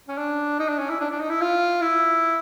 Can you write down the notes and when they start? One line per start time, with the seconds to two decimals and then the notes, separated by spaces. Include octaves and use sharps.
0.08 C#4
0.18 D4
0.59 D#4
0.68 D4
0.79 C#4
0.89 E4
1.00 D4
1.10 D4
1.20 D#4
1.30 E4
1.41 F4
1.81 E4